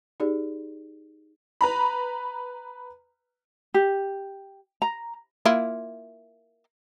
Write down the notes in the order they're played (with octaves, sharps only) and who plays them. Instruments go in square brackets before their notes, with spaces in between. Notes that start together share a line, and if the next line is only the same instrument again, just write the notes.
[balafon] D#4 G4 G#4 D5
[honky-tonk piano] B4 A#5 B5
[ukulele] G4
A#5
[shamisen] A#3 E4 F4